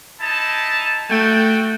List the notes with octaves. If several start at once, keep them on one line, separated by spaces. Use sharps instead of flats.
D#4 E4 A5
A3 F#4 G5